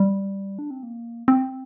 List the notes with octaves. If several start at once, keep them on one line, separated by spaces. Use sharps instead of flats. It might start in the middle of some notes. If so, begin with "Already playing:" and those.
Already playing: G3
D4
C4
A#3
C4